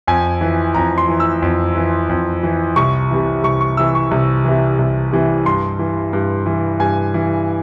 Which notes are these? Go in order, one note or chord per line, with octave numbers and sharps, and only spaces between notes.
F2 G#5
E3
F2 A#5
C6
E3
E6
F2
E3
F2
E3
C2 C#6
C3 E3
C2 C#6
C#6
C3 E3 E6
C#6
C2
C3 E3
C2
C3 E3
G2 C6
E3
G2
E3
G2 G#5
E3